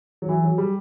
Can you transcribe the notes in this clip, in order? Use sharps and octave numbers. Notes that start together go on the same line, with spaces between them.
F#3
E3
F#3
G3